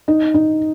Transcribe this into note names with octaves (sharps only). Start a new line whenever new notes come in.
D#4
D#4